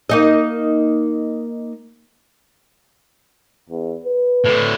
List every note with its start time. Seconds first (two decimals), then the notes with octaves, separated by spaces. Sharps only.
0.10 A#3 D#4 D#5
3.69 E2
4.06 B4
4.44 A2 D3